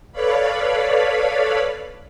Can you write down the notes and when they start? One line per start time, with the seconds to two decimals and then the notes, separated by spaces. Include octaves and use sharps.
0.12 A4 B4 C#5 D5 F5 B5